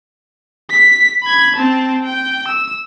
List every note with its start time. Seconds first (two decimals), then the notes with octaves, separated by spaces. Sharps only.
0.70 B6
1.23 B5 G#6
1.56 C4 A5
2.03 G5
2.48 E6